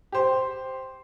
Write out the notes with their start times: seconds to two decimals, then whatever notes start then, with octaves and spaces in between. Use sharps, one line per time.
0.12 G4 C5